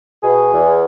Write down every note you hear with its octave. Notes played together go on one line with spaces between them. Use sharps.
B2 G#4
E2